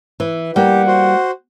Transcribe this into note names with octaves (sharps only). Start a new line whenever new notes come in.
E3
G3 A#3 G4 F#5
F#4 C5